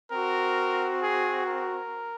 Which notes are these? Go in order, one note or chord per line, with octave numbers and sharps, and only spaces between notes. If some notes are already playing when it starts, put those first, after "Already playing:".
C4 F#4 A#4
G#4
A#4